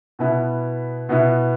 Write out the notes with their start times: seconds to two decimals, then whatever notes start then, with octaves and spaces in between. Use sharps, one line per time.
0.19 B2 B3 E4
1.09 B2 B3 E4